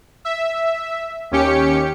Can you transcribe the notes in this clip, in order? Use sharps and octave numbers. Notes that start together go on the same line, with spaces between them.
E5
D#2 C#4 G4 C#7